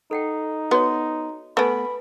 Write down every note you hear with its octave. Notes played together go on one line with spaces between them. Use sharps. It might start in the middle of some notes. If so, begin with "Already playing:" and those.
D#4 A4 F#5 G5
B3 F#4 C#5
A3 B3 B4 G#5 B5